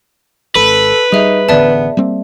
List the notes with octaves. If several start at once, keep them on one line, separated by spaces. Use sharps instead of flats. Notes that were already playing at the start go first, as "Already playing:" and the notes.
G#1 A4 B4
G3 D#4 G#4 E5
A1 D3 B3 D5 E5 A5
G3 A#3 C4